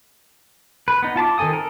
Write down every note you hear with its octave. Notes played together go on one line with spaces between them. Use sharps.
B4
B3 D#4
F4 A5 B5 D6
D#3 C4 A4 G#5 D#6
A4 A#4